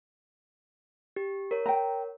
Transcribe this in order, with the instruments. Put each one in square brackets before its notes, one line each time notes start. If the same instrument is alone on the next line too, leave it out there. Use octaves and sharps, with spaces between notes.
[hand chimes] G4
A#4 C#5
[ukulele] G5 A#5